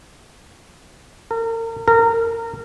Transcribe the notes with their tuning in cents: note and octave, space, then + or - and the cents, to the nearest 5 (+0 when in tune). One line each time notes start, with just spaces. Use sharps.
A#4 -35
A#4 -25